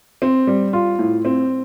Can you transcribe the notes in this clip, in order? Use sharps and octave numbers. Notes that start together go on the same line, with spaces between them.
C4
G3
F4
A2
C4